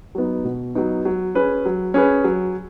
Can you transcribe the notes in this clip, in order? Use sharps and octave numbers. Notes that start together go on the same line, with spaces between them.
F#3 B3 D#4
B2
F#3 B3 D#4
F#3
C#4 G#4 B4
F#3
C#4 G#4 B4
F#3